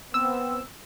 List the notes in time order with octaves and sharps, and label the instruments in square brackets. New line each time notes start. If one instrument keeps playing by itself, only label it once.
[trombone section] B3 C4 [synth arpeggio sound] E6